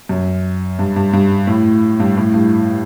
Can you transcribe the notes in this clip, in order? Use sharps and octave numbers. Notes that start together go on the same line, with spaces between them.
F#2
G2
G2
G2
A2
G2
A2
G2